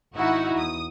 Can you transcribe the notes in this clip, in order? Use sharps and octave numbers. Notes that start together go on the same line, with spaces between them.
G#1 D#4 E4 F#4 F#5
E2 D#6